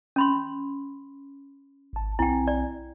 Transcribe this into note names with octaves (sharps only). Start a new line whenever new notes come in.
C#4 B5 C6
G#1 A5
B1 C4 E4 G5 G#5
D5